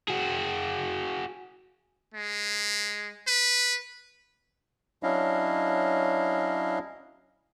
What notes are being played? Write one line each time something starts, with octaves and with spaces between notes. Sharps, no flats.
F#4 G#4
G#3
B4
F#3 C#4 D4 E4 D#5 F5